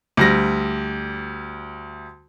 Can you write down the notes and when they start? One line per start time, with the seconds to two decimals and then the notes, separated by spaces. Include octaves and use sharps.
0.17 D2 G3 A#6